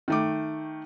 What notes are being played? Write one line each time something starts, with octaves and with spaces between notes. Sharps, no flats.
D#3 A3 D6